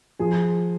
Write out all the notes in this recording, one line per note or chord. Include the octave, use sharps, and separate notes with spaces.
F3 G#4